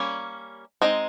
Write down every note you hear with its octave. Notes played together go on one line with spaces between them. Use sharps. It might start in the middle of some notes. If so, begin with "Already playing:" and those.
Already playing: G3 A#3 C#4
G#3 C4 D#4 D#5